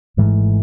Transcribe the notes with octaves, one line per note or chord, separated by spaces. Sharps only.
G#1 G#2 E3 A3